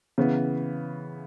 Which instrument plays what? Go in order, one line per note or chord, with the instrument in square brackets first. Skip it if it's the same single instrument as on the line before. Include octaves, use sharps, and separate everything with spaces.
[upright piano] C#3 E3 B3